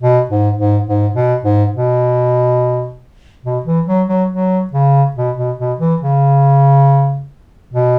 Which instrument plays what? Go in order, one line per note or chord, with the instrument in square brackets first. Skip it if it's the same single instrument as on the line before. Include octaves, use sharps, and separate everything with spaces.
[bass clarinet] B2
G#2
G#2
G#2
B2
G#2
B2
B2
E3
F#3
F#3
F#3
C#3
B2
B2
B2
E3
C#3
B2